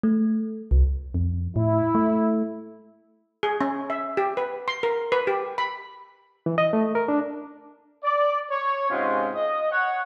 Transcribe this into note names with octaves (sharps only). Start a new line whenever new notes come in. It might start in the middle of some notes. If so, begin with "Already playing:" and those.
A3
C2
F2
A2 E4
A3
G#4
C#4
E5
G4
B4
C6
A#4
B4
G4
B5
E3
D#5
A3
A#4
D4
D5
C#5
G#2 C3 G#3 C#4 F4
D#5
C#5 F#5